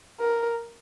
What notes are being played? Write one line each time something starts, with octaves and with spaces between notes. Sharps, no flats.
A#4